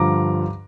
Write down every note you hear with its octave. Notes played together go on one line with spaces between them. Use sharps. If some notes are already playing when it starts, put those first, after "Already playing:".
Already playing: G2 D3 F3 A#5 D6